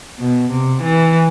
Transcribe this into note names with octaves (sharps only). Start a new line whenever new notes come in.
B2
C3
E3